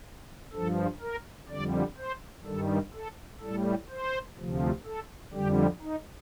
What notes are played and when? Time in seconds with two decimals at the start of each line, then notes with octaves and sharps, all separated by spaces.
0.53 G2 F3 A4
1.01 A#4
1.49 F2 D3 G3 D5
1.97 C5
2.45 G2 D#3 G3 A4
2.94 A4
3.41 A2 G3 A4
3.89 C5
4.37 D2 C3 F3
4.85 A4
5.33 F2 D3 G3 G4
5.81 D#4